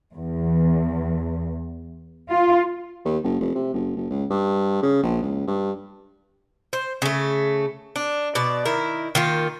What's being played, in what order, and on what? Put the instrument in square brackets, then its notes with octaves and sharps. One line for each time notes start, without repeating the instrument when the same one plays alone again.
[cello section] E2
F4
[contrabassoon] D#2
F#1
F1
C3
F#1
F#1
C#2
G2
C#3
A#1
C#2
G2
[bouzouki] C5
C#3 A3
D4
B2 D5
D#3 E4 A#4
D#3 A#3 F4